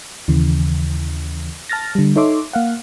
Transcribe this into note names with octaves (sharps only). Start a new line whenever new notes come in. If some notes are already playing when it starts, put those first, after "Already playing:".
D#2 C#3 E3
A5 F6 A6 A#6
D3 G3
D#4 A4 C#5 E5 C6 D6
A#3 F5 F#5